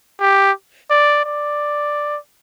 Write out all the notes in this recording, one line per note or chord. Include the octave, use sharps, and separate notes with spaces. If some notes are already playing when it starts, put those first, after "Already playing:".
G4
D5
D5